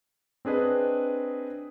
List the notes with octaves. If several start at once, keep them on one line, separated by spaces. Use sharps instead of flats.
C4 D4 G#4 B4 D#5